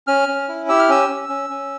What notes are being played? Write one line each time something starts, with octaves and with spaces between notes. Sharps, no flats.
C#4 F6
C#4
E4
G4 E6
F6
C#4 E6
C#4
C#4
C#4